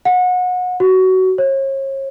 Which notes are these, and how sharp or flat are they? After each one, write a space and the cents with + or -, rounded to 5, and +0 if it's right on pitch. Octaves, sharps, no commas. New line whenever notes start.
F#5 -30
F#4 +20
C#5 -40